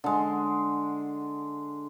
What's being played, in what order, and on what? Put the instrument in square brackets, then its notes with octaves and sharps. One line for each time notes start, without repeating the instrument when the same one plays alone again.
[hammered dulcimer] D3 G#3